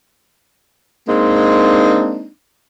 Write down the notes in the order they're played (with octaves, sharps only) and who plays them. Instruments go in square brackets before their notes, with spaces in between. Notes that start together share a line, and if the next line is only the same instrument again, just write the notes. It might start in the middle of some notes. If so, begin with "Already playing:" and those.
[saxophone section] G#3 A#3 C4 D4 D#4